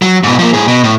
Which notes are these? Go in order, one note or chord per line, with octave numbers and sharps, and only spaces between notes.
F#3
G#2 B2
F3 A#3
A2 G#4
B2
A2